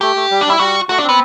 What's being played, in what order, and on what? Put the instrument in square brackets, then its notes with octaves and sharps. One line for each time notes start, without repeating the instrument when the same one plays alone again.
[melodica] A3 [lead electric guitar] G4
[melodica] A3
G3
[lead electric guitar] D4
[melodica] G3 [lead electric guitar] E4
[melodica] G3 [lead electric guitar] F#4
[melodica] A3 [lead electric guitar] F#4
[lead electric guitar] D4
[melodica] C4
[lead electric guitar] B3